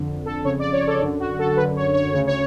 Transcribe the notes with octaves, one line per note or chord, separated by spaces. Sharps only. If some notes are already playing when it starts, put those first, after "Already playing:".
Already playing: F2 D3
A4
F2 C#3 C#5
D5
C#5
A4
F#2 D3
F#4
A4
F#2 D3 B4
C#5
C#5
D2 C#3 C#5
C#5